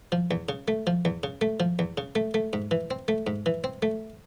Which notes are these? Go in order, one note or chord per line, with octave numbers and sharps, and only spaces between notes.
F3
E2
C#3
A3
F3
E2
C#3
A3
F3
E2
C#3
A3
A3
G#2
E3
C4
A3
G#2
E3
C4
A3